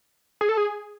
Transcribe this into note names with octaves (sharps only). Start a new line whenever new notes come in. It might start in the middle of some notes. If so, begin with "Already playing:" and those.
G#4
A4
G#4